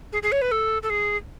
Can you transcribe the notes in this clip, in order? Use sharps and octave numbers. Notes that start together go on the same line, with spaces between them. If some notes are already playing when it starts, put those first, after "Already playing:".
G#4
G#4
C#5
B4
A4
A4
G#4